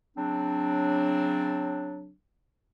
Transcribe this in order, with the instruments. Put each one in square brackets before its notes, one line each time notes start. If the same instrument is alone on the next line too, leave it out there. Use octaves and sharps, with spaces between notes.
[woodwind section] C#3 F#3 C4 D4